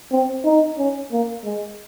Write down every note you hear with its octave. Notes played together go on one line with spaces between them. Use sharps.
C4
D#4
C#4
A#3
G#3